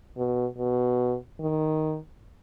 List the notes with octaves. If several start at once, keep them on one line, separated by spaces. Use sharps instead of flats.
B2
B2
D#3